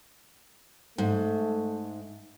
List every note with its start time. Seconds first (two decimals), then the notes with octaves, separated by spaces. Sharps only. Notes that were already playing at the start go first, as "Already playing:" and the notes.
0.98 G#2 A3